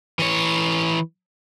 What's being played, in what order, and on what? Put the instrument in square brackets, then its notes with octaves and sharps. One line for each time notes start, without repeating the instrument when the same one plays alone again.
[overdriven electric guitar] E3 C#5